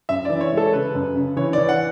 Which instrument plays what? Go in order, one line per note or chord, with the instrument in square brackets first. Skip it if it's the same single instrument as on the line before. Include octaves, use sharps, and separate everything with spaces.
[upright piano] F#2 [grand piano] E5
[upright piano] E3 [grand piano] D5
[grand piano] C#5
[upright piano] G#3
[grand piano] A4
[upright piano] C#3 [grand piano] B4
[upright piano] F#2
C#3
[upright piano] E3 [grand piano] C#5
[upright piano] E3 [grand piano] D5
[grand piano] F#5